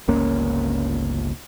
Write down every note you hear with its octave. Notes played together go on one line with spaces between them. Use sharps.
G1 C#2 A#3 C#4